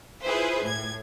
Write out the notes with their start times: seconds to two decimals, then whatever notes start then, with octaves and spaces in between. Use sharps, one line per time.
0.23 E4 F4 G#4 B4 C5
0.64 A2 G#6